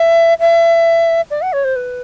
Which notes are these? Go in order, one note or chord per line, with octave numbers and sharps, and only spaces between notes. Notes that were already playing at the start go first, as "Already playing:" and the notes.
Already playing: E5
E5
D5
F#5
C#5
C5
B4